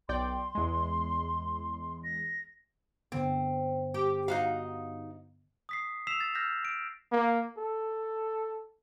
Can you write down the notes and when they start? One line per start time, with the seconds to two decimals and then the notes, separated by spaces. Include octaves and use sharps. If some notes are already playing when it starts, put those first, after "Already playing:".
0.09 B1 D5 G5 C6
0.55 E2 G#3
2.04 A#6
3.12 G2 D3 B3 C4
3.94 G4
4.28 D#4 F#4 F5
5.69 D#6 B6 C7
6.07 E6 B6 C7 E7 F7
6.20 A6
6.35 E6 F6 G6 A#6 B6
6.65 D7
7.12 A#3
7.58 A4